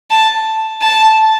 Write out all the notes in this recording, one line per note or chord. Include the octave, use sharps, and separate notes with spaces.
A5
A5